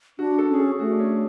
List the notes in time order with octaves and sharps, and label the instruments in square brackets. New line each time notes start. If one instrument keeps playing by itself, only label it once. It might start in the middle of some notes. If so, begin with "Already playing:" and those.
[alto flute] D4 [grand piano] F#4
[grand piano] A4
[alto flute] C#4 [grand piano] G#4
[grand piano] A4
[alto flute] A3 [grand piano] F#4
[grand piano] D4
C#4